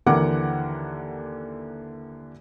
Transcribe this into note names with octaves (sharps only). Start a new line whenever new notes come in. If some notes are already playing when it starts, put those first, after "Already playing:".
D#2 D3 E3 A#4 F#5 D6